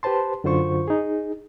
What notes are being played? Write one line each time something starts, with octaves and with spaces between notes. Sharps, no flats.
G4 B4 C5 A5 C6
F#2 D3 F4 C5 C#6
D#4 G#4